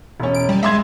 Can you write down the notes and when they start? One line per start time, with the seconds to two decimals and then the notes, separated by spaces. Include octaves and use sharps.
0.20 E1 C#4
0.34 D7
0.49 G3
0.63 G#3 E5 C6 G#6